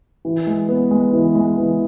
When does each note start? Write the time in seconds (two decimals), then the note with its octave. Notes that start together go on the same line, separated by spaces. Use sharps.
0.25 E3
0.47 G#3
0.69 B3
0.91 G#3
1.13 E3
1.35 G#3
1.58 E3